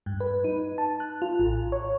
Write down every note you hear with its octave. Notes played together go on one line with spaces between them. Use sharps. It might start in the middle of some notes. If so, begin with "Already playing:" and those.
G2
B4
D#4
A5
F#6
F4
A1
C#5